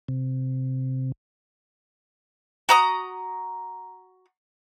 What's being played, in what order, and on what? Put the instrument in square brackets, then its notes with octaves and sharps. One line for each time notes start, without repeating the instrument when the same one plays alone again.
[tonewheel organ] C3
[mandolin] F#4 A#5 D#6